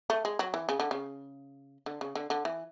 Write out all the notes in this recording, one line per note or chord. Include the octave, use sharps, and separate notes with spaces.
A3
G#3
F#3
E3
C#3
D3
C#3
D3
C#3
D3
D3
E3